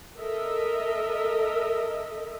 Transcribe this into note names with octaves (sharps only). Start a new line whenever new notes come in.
A4 A#4 D#5 E5